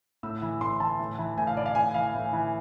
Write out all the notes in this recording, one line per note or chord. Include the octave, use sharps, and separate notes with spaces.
A2 E6
E3
A2 C6
E3 A5
A2
E3
A2 G#5
F5
E3 D5
F5
A2 G#5
E3 F5
A2
E3